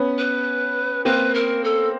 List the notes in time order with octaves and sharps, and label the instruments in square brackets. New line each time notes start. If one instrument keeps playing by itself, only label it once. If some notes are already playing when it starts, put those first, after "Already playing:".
Already playing: [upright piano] B3 C#4
[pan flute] B4
[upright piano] A#3 C4 [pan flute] B4
[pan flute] A#4
A4